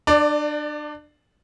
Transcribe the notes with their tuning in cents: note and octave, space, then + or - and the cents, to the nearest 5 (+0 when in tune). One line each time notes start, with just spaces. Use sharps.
D4 +30 D5 +0